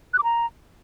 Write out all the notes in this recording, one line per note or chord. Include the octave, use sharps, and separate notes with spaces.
F#6
D6
A#5